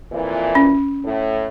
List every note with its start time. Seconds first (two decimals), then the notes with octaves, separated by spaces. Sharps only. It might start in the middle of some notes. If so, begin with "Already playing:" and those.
0.12 F2 A#2 E3
0.55 C#4
1.05 A2